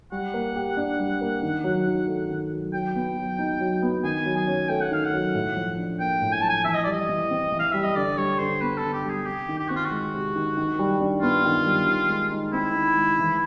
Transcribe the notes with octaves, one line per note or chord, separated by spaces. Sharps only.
G3 F#5
A#3
G4
D4
G3
A#3
D#3
F#3
D#3
A3
D#3
F#3
F#3 G5
B3
F#3
D#4
F#3
B3
D#3 G#5
F#3
G#5
C#4
A3 G5
F#5
D#3 F5
F#5
F#3
A2
F3
D4
A#3 G5
A2
G#5
F3 A5
G#5
E3 E5
D#5
G3 D5
D#5
E3
C4
E3
F5
G3 E5
D#5
D3 D5
G3 C#5
D3 C5
B3 B4
A4
D3
G4
G3
G#4
C3 G4
D#3
G4
C4 F#4
F4
F#4
G#3
C3
D#3
D#3
G3
D4
B3 F4
D#3
G3
D#3
G#3
D#4
C4 E4
D#3
G#3
E3